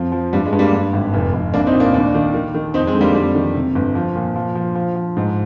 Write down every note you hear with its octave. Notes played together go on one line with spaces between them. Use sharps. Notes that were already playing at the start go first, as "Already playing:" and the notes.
Already playing: F2 F3
F3
G2 G3
G#3
G2
G3 A#3
G2
G#1
F1
F1
C2 A#3 D4
C4 D#4
A#2
A#3 D4
D#2 A#3 D4
D#3
D#3
D#3
F2 C4 D#4
G#3 C4
D3
G3 A#3
F2 G3
D#3
C3
G1
F3
A#2
F3
F3
F3
F3
G#2